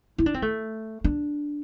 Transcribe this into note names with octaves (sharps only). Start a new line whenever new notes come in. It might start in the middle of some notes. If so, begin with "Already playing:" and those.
E4
D4
C4
A3
D4